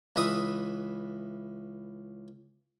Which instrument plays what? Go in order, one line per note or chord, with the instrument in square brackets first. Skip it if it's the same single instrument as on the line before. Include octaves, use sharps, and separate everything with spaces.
[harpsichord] C#2 E3 B4 E5 D#6